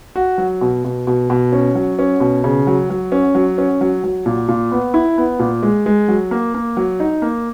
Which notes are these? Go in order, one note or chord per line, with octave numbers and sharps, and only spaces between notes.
F#4
F#3
B2
B2
B2
B2
C#4
F#3
C#4
B2
C#3
F#3
F#3
C#4
F#3
C#4
F#3
F#3
A#2
A#2
B3
E4
B3
A#2
G#3
G#3
F#3
A#3
A#3
F#3
D#4
A#3